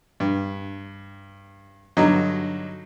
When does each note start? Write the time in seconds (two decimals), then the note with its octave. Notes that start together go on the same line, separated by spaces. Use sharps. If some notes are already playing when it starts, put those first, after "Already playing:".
0.20 G2
1.97 G2 D3 F#3 D#4